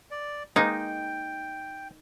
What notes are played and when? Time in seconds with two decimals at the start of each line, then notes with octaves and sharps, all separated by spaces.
0.11 D5
0.56 G#3 A#3 D#4 G5